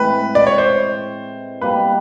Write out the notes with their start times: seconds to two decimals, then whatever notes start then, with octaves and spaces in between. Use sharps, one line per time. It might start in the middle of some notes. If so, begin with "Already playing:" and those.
Already playing: A2 E3 G#3 C4 B4
0.35 D5
0.47 C#5
0.58 C5
1.62 B2 G3 A#3 B4